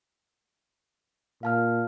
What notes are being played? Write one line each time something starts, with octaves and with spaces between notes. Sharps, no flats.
A#2 F5 A5 F6